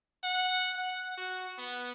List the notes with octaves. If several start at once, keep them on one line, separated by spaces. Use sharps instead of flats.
F#5
F#5
F#4
B3